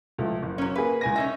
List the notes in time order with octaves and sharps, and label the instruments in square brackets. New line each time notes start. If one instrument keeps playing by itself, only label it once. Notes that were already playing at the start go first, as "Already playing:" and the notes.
[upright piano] C#2 F3 A3
F#1
[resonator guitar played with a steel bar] F#3 C#4
[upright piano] A#3 G#4 [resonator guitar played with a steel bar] B4
[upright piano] C#2 G#5 A#6
[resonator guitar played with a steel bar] C#4 D#4 E5 [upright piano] A#6